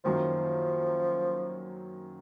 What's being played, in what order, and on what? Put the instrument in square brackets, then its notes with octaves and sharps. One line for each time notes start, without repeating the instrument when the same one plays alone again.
[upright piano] F#2 D#3 F#3 A#3 [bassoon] F3